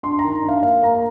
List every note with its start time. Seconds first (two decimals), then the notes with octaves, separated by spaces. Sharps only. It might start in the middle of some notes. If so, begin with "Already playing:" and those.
0.03 D4 C6
0.19 A#5
0.24 D#3
0.43 D4
0.49 F5
0.63 A#3 F5
0.83 A#3 A#5